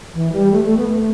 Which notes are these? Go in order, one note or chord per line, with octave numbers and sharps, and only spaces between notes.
E3
G3
A3
A3
B3
A3